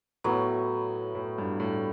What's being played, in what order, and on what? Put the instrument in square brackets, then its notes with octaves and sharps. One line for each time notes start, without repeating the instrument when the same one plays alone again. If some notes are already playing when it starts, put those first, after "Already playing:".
[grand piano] A2 [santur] F#3 B3 E4
[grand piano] A2
G2
A2